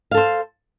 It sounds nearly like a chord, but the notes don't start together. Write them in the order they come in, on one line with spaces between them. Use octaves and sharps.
F5 A4 C5